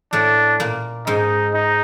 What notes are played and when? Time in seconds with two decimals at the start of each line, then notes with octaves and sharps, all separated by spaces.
0.13 A2 A3 D4
0.60 A#2 A#3
1.06 G#2 G#3 D#4
1.53 D#4